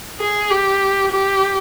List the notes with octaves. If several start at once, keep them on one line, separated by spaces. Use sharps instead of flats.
G#4
G4
G4